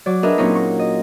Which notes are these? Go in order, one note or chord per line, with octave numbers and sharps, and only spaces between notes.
F#3 D5
D4 G#4 A#4 B4 D#5 E5
A#2 F#3 C4 C#4 D#4 F4
C#6
D#5